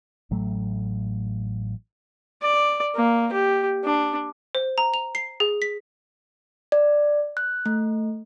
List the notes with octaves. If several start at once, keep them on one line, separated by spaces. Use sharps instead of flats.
A1 A2 F#3 A3
D5
A#3
G4
D4
C5
A#5
F7
C7
G#4
B6
D5
F#6
A3